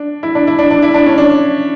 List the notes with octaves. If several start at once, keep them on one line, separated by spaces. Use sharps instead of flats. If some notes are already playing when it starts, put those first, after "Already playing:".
Already playing: D4
E4
D4
E4
D4
D4
E4
D4
C#4
D4